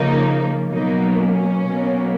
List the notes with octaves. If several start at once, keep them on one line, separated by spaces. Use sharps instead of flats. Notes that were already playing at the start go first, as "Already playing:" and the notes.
Already playing: C#3 F3 A#3 D#4
B2 F#3 A#3 D#4
C#4
B2 F#3 A#3